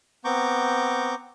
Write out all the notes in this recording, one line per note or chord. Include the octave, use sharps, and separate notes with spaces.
B3 C4 A#5 C#6 D6 G6